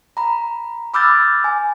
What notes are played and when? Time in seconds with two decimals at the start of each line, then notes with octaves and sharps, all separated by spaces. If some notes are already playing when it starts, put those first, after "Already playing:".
0.17 A#5 B5
0.94 B5 D6 E6 F6 G6 A6
1.44 G#5